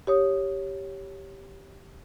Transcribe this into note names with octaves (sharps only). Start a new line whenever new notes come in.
G4 C#5 D#6